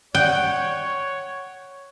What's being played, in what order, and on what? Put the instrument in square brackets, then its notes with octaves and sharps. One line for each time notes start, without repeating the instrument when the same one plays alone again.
[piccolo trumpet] C#5 [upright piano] F#5 F#6 [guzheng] G5